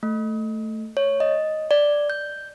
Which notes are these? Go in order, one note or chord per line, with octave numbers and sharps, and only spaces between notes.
A3
C#5
D#5
D5
G6